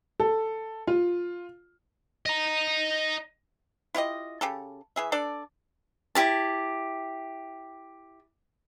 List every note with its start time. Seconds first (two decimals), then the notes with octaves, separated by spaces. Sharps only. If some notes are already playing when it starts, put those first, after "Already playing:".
0.20 A4
0.87 F4
2.26 D#5 A#5
3.94 E4 F4 G4 D#5
4.41 C#3 G4 A4
4.96 E3 G#4 E5
5.12 D4 A4 D5
6.15 E4 G4 A5